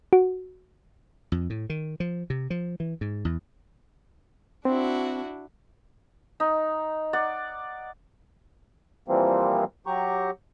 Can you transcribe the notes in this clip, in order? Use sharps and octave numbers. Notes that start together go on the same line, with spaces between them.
F#4
F2
A2
D#3
F3
C3
F3
E3
G#2
E2
C4 D4 E4 F#4
D#4
D5 F#5
A#2 E3 F3 G3 A#3 C4
F#3 G4 A#5 C#6